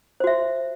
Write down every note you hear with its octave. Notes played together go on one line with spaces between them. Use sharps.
F#4 C5 E5